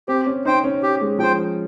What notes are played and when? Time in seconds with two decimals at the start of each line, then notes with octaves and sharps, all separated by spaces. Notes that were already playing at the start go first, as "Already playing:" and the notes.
0.08 C4 G4
0.26 C#4
0.45 D#4 C5 G5
0.64 C#4
0.83 G4
1.01 G#3
1.19 F3 C5 G5